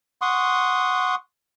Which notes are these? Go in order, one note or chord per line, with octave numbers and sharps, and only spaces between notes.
F#5 C6 C#6 D#6